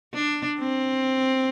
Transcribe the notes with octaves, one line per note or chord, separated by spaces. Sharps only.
D4
C4